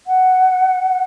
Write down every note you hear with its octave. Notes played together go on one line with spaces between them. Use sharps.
F#5